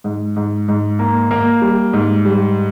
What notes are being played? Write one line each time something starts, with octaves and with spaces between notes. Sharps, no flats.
G#2
G#2
G#2
A#3
A#3
G3
G#2
G3